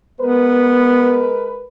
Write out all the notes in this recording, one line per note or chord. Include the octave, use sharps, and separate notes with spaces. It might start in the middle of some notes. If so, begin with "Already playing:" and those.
G#3 B3 A#4 B4